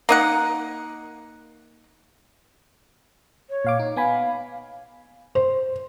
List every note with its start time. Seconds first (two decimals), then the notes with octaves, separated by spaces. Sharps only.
0.09 A#3 D#4 F#5
3.50 C#5
3.65 A#2 F5 D6
3.79 D#4
3.96 B3 F5 G#5 B5
5.35 C5